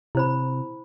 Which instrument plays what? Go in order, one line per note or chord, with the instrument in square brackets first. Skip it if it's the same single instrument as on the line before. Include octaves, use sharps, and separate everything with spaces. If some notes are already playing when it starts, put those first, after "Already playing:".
[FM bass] C3 [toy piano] E4 C5 B5